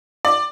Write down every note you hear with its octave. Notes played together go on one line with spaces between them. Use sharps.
D5